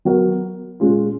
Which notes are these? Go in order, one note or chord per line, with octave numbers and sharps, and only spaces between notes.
F#3 B3 F#4 A#4
A#2 G#3 C#4 F4